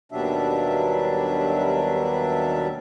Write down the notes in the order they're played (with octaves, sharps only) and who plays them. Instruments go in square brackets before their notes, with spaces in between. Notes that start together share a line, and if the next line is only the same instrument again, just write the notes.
[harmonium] D#2 B2 F#3 G3 D4 E5